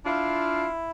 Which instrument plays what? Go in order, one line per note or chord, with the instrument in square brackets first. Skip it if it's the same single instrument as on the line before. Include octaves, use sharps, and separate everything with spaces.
[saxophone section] D4 F4 [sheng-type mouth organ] E4